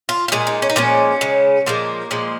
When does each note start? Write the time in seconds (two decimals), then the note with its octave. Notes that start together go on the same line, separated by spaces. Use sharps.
0.09 F4
0.28 F4
0.32 A#2 G#3 G#4
0.47 D#4
0.62 C#4
0.70 D#4
0.76 A#2 F3 G#3 C#4
1.21 C#3 G#3
1.66 A#2 F3 G#3 A#3
2.11 A#2 F3 G#3